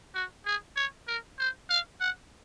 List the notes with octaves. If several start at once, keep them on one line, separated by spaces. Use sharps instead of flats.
F#4
G#4
C#5
A#4
C5
F5
F#5